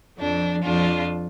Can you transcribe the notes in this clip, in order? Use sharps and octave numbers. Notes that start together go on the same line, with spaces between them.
F2 F3 D4
F2 F3 D4 F4